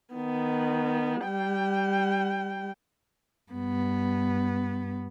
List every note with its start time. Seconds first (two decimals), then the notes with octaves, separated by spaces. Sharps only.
0.14 D#3 B3
1.24 G3 G5
3.52 G2 B3